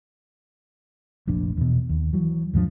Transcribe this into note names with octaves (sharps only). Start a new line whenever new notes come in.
F1 A#1 D4
E2 B2
D#2
E3 F#3
D#2 G#2 F3 D4